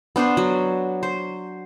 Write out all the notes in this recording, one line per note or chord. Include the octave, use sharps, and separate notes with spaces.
B3 D4 B4 C5
F#3
C5